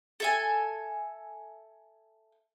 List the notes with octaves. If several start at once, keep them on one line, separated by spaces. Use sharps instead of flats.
A4 E5 G#5